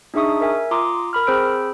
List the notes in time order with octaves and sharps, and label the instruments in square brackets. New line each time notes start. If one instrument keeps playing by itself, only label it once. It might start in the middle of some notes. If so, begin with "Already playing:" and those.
[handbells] D4 D#4 G#4 E5 C#6 D#6
A#4 E5 G#5
F4 A#5 C6 D6 D#6
A#4 B5 F6
C4 G#4 C5 B5 E6 D7